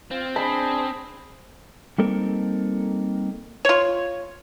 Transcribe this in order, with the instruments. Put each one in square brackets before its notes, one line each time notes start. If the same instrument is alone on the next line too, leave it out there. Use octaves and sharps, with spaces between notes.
[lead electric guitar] C4 [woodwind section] F4
[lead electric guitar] C4 [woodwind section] D4 G#4 [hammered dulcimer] B5
[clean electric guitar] G3 A#3 C4 D#4 A4 A#4
[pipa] F4 C#5